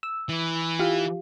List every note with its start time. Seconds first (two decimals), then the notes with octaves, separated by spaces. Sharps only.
0.03 E6
0.29 E3
0.79 F4 G4 F5